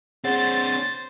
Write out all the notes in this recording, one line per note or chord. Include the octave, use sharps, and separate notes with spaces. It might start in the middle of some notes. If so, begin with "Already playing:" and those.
C4 D4 G#4 C5 C#5 F#5 A6